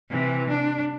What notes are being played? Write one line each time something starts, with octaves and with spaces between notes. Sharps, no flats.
C3 E3
D4